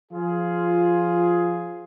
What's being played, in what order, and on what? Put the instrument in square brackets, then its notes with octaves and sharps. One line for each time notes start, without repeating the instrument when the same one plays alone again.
[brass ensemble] F3 F4 G#4